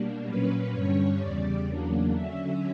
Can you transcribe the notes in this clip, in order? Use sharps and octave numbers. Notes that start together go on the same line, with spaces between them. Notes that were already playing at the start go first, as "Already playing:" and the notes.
Already playing: B2 G3 A#3 D4
A#2 F#3 A#3 C#4 B4
G2 D3 G3 C#4 C#5
E2 C#3 G3 D5
E2 C#3 F#3 A#3 D4
D3 F#3 C#4 E5